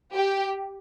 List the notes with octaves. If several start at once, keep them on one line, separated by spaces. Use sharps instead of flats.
G4